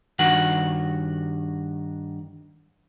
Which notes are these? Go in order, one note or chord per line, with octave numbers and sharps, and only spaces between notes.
G2 D#3 F#4 F#5